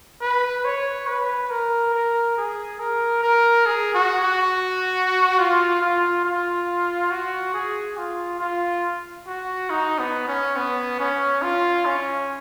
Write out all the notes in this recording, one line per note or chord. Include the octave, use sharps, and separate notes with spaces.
B4
C#5
B4
A#4
A#4
G#4
A#4
A#4
G#4
F#4
F#4
F4
F4
F4
F#4
G#4
F4
F4
F#4
D#4
B3
C#4
B3
C#4
F4
C#4